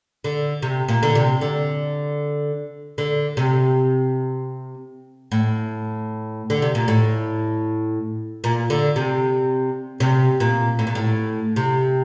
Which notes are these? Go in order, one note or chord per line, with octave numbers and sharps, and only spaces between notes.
D3
C3
A#2
D3
C3
D3
D3
C3
A2
D3
C3
A#2
A2
A#2
D3
C3
C3
A#2
A2
A#2
A2
C3